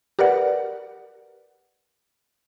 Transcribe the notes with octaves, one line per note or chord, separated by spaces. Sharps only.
G4 A#4 B4 D5 F#5